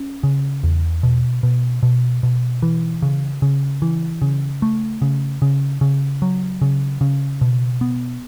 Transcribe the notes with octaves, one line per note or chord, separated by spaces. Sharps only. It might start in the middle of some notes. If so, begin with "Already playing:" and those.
Already playing: C#4
C#3
E2
B2
B2
B2
B2
E3
C#3
C#3
E3
C#3
A3
C#3
C#3
C#3
F#3
C#3
C#3
B2
B3